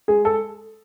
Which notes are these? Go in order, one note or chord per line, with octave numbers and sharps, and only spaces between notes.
G#3 G#4
A4